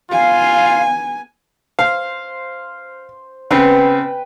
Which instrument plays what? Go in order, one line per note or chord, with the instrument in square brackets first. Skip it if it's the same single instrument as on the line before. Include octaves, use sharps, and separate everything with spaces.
[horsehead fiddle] B3 G#5 [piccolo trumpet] F4 [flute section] F5
[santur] C5 [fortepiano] F5
[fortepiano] C#3 B3 C4 [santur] B4 G5